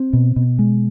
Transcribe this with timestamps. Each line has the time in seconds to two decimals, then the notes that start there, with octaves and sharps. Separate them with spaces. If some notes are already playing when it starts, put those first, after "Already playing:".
Already playing: C4
0.13 B2
0.36 B2
0.59 G#3